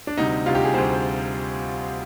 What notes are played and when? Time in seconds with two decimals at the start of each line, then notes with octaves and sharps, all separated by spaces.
0.07 D4
0.17 D2 C3 G3 D#4
0.46 D2 C3 G3 F4
0.55 G4
0.65 G#4
0.74 D2 C3 G3 C5